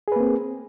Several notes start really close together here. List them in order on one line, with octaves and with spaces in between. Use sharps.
G#4 B4 A#3 C4